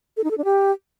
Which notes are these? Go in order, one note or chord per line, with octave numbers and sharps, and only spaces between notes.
A4
D#4
A4
D4
G4